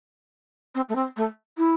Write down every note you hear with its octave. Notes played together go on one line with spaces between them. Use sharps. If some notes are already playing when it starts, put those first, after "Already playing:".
C4
A3
C4
A3
E4